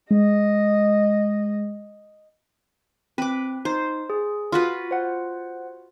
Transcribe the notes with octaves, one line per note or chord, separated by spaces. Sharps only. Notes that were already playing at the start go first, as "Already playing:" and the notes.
G#3 D#5
C4 B4 D6
D#4 C5
G#4
F4 F#4 B4
C5 F#5